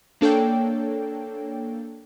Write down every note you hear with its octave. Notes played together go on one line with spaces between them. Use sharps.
A#3 D4 A4 C#5 G5